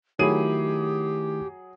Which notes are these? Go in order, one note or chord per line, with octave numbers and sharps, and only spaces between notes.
D#3 F#3 A3 E4 G4 G#4 D#7